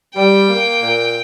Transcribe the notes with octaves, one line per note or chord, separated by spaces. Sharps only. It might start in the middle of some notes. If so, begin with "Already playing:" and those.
G3 G5
A#3
A#2